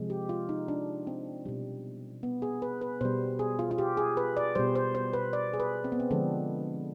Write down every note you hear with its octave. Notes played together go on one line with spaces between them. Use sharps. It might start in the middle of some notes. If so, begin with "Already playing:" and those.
Already playing: C3 F3 G#3
G4
F4
D#4
D4
C4
B2 G3
B3
G#4
B4
B4
B2 G3 C5
G#4
F4
F4
G4
G#4
B4
D5
B2 G3 C5
C5
C5
B4
D5
G#4
B4
C4
B3
C4
D3 F3 G#3 D4